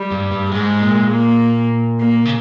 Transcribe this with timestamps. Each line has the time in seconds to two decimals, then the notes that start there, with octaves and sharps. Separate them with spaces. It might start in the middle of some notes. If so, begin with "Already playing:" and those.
Already playing: G3
0.12 G2
0.31 G2
0.51 G#2 G#3
0.81 A#2
1.11 A#3
2.01 A#3
2.25 C#3